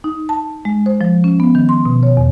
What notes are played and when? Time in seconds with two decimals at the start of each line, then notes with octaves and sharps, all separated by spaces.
0.04 D#4
0.29 A5
0.65 G#3
0.86 C5
1.01 F3
1.24 C#4
1.40 B3
1.55 D#3
1.69 C6
1.85 B2
2.03 C#5
2.17 E2